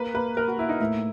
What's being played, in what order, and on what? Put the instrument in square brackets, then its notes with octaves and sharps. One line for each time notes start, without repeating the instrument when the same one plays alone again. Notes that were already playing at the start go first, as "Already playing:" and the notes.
Already playing: [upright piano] A#3 [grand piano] B4
[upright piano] A#3 [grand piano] B4
[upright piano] A#3 [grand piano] A#4
[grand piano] F#4
[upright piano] A#3 [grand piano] E4
[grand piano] D#4
[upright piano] A2 [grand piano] E4